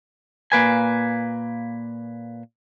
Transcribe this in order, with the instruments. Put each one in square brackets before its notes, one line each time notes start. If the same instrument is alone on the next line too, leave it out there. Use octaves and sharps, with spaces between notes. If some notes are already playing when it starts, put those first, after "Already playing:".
[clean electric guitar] A#2 A#3 B4 G#5